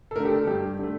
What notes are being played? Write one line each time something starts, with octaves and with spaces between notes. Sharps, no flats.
A4
D3 A3 A#4
G4
A4
G2 G4
D3 A3